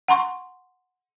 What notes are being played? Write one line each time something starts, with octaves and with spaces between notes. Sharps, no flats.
F#5 A#5 C6 C#6